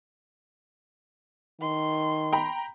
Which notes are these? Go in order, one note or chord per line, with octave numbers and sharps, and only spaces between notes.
D#3 C6
G5 A#5 B5